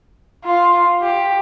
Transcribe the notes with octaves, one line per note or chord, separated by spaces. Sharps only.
F4
G4